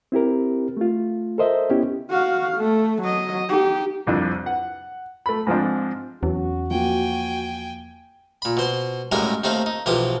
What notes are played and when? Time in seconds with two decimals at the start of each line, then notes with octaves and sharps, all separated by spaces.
0.12 C4 E4 G4 A#4
0.77 A3 F4
1.38 A4 A#4 C5 D#5 E5
1.70 B3 C#4 E4 G4
2.10 F#4 F5
2.57 A3
3.02 F#3 D#5
3.49 D#4 G4
4.07 C2 F2 D4
4.46 F#5
5.26 A3 B5
5.47 G#2 F3 C4 D4
6.23 E2 F#3 C#4 F#4
6.71 F3 A#3 G5 G#5
8.42 A#2 B5
8.57 B2 C5 C6
9.12 F#2 A2 G3 G#3 A#4 F5
9.44 D#2 A3 C4 D#4 F5
9.66 D#4
9.86 B1 E3 F3 G4 D#6